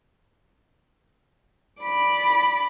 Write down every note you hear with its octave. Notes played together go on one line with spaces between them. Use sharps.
D5 B5